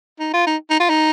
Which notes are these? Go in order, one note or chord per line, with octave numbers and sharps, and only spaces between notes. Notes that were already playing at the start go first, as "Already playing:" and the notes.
D#4
F4
D#4
D#4
F4
D#4